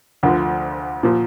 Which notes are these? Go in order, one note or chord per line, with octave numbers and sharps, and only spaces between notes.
D2 D3 F3
A#2 F3